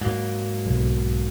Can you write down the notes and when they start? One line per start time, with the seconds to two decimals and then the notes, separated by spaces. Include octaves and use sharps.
0.01 G#2 F#3 A#3
0.66 B1